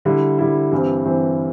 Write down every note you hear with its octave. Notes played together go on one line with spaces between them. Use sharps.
D3 G3 E4
D3 G3 E4
G2 E3 G3 C4
G2 E3 G3 C4